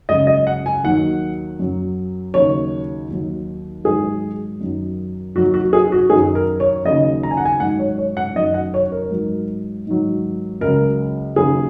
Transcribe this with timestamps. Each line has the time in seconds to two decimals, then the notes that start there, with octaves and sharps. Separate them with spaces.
0.09 C#2 C#3 F#3 D#5
0.27 D#5
0.47 F#5
0.66 G#5
0.83 D#2 D#3 F#3 F#5
1.59 F#2 F#3
2.34 D#2 C#3 F#3 C#5
3.09 D#2 D#3 F#3
3.84 G#2 D#3 F#3 G#4
4.61 F#2 D#3 F#3
5.35 D#2 D#3 F#3 F#4
5.54 F#4
5.73 G#4
5.92 F#4
6.10 F#2 D#3 F#3 G#4
6.35 A#4
6.60 C#5
6.85 D#2 C#3 F#3 D#5
7.23 A#5
7.31 G#5
7.37 F#5
7.45 G#5
7.60 G#2 D#3 F#3 F#5
7.79 C#5
7.98 C#5
8.17 F#5
8.36 F#2 D#3 F#3 D#5
8.54 F#5
8.74 C#5
8.92 A#4
9.11 G#2 F#3
9.87 G#2 D#3 F#3
10.61 C#2 C#3 F#3 A#4
11.36 D#2 C#3 F#3 G#4